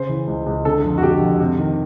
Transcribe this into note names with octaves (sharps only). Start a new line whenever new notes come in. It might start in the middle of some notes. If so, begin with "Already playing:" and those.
Already playing: C#3 C5
E3
C#2
C#2
D3 A4
F2
F#4
D3 G4
F2
C3
D#3